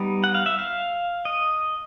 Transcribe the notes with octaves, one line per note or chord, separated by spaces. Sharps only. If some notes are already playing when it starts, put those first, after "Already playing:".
Already playing: G3 B3 D#4
F#5
F5
E5
F5
D#5